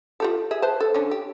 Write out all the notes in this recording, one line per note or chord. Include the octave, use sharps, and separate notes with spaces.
F4 G4 A4
G#4 E5
B4 C5 A5
A4
D3 C#4
G4